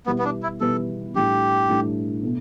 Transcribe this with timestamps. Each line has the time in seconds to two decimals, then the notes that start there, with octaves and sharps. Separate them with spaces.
0.06 B2 G3 B3 E4 B4
0.19 B3
0.25 D4
0.43 E4
0.60 B2 G3 E4 A4 B4
1.15 A2 G3 D4 G4
1.69 A2 G3 D4
2.23 B2 A3